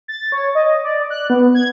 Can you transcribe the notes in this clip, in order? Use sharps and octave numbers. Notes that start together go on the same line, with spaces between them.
A6
C#5
D#5
D5
F#6
B3
G#6